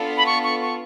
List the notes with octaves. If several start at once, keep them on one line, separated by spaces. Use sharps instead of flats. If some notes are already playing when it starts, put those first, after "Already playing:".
Already playing: B3 D4 F4 A4
B5
C#6
C#6
C#6